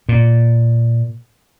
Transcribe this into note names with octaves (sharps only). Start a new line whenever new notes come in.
A#2